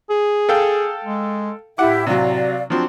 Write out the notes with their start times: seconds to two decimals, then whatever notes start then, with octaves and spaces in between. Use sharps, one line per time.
0.10 G#4
0.49 A4 F5 G5
1.05 G#3
1.78 A2 E4 G4 E5 F#5 D6
2.06 C3 F#3 D5 F5
2.70 F3 F#3 C4 D4